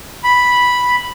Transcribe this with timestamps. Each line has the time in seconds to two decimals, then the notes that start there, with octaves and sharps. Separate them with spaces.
0.24 B5